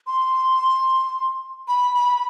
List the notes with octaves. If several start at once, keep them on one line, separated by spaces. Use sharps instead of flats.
C6
B5
B5